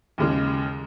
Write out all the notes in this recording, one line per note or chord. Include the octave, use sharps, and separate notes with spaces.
D#2 C#3 G#3